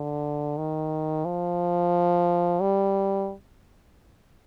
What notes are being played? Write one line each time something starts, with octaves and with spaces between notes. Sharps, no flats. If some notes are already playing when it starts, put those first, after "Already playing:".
Already playing: D3
D#3
F3
G3